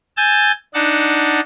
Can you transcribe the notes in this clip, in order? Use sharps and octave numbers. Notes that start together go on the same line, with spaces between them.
G#5 E6 G6 A6
D4 D#4 F#5 A5